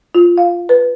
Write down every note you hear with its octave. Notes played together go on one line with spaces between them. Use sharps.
F4
F5
B4